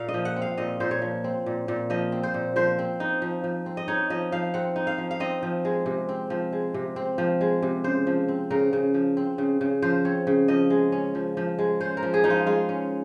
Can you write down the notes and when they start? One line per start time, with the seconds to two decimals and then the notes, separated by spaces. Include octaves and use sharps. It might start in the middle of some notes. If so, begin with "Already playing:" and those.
Already playing: A#2 F5
0.08 D#5
0.14 F3
0.25 F#5
0.36 C4
0.42 F5
0.58 A#2 D#5
0.80 A#2 C5
0.91 C#5
1.02 F3
1.24 C4
1.46 A#2
1.68 A#2
1.90 F3 D#5
2.12 C4
2.23 C5
2.34 A#2
2.56 F3 C5
2.79 C4
3.00 D#4
3.22 F3
3.44 F3
3.66 C4
3.77 D#5
3.88 D#4 C#5
4.10 F3 D#5
4.32 F3 F5
4.54 C4 F#5
4.76 D#4
4.87 F5
4.98 F3
5.11 F5
5.20 C4 D#5
5.43 F3
5.65 G#3
5.86 C3
6.09 C4
6.30 F3
6.53 G#3
6.74 C3
6.96 C4
7.18 F3
7.41 G#3
7.62 C3
7.84 C#3 C5
8.07 F3
8.28 C4
8.51 C#3 A#4
8.73 C#3
8.94 F3
9.17 C4
9.38 C#3
9.61 C#3
9.82 F3 C5
10.05 C4 C#5
10.27 C#3
10.48 F3 D#5
10.70 G#3
10.92 C#4
11.15 F3
11.37 F3
11.59 G#3
11.81 C#4 C5
11.97 A#4
12.03 F3
12.14 G#4
12.24 F3 D#4
12.30 F4
12.46 G#3 F4
12.69 C#4